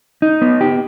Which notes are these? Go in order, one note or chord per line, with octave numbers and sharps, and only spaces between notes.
D#4
B3
G4